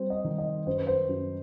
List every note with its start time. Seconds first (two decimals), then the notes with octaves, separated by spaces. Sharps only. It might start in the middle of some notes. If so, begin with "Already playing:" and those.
Already playing: G3 C4 C5
0.10 D#5
0.24 D#3
0.38 D#5
0.66 F#2 C5
0.77 B4
0.87 C5
1.09 F#2